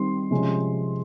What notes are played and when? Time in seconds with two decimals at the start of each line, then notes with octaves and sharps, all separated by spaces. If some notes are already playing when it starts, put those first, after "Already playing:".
Already playing: D#3 G3 C4 C6
0.31 C3 F3 G#3 C#4